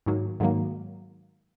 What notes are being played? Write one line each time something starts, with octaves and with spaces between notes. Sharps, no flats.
G#2 D#3 F#3 A#3
G#2 D#3 F#3 A#3